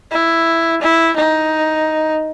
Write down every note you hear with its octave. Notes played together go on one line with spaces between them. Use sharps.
E4
E4
D#4